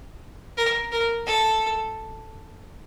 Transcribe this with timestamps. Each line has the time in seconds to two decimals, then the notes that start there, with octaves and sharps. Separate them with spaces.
0.57 A#4
0.92 A#4
1.26 A4